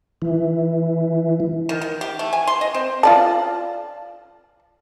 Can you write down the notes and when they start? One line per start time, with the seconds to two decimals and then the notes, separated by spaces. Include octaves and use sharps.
0.22 E3
1.69 D#3
1.81 D#3
2.01 G4
2.19 A3
2.33 G#5
2.47 C6
2.61 D#5
2.74 C4
3.03 F4 D5 A5